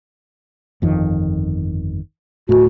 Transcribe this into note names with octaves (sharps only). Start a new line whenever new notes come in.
G1 F2 D#3
D1 G#1 A2 F#4